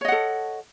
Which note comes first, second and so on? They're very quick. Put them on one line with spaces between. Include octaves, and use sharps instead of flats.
C#5 D#5 F#5 A4